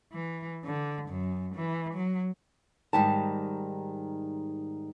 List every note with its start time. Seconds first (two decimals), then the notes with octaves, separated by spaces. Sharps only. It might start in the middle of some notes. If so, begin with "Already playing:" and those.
0.12 E3
0.65 D3
1.09 F#2
1.55 E3
1.94 F#3
2.93 G#2 D#3 G3 G4 A5